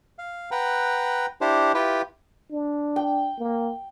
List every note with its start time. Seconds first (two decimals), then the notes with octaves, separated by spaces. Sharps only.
0.19 F5
0.51 B4 F#5 G5 A#5
1.41 D4 E4 G4 C5
1.74 E4 F4 G4 B4 G5
2.51 D4
2.96 G5
3.39 A#3